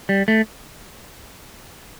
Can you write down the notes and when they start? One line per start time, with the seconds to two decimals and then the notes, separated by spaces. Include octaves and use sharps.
0.09 G3
0.28 A3